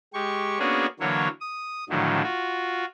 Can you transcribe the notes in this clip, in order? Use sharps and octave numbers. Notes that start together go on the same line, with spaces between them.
G#3 G4 C#6
A#3 B3 C#4 D4 F#4 G#4
D3 E3 F#3 A#3 C#5
D#6
A2 D3 D#3 F3 F#3
F4 F#4